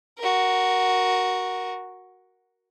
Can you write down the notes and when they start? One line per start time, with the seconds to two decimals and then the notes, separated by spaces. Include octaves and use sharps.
0.18 F#4 A#4